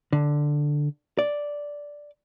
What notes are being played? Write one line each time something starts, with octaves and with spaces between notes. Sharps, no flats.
D3
D5